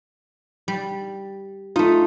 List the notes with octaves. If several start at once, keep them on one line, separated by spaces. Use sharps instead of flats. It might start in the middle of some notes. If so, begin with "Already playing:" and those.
G3
A3 D#4 F4